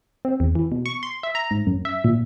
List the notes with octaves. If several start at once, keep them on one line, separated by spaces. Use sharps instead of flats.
C4
E2
E3
B2
C#6
C6
E5
A#5
G#2
F#2
E5
A#2